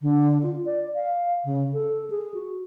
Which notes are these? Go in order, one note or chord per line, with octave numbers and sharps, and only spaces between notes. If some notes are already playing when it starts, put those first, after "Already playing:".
D3
F4
D5
F5
C#3
A4
G#4
F#4